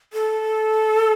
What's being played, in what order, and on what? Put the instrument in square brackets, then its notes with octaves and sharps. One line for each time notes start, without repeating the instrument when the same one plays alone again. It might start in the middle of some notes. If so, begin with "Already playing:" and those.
[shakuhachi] A4